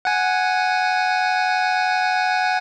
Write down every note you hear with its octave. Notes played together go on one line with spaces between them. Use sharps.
F#5 G#5